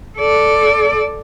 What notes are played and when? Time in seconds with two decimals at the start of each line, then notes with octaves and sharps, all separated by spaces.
0.18 A4 D5